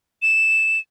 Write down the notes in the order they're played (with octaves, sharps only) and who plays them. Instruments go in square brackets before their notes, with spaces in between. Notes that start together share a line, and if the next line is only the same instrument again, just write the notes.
[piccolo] E7